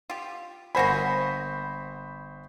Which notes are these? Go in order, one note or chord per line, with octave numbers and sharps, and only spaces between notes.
F4 G4
G1 A#3 F#4 C5 G#5 B5